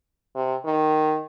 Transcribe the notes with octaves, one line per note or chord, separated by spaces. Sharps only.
C3
D#3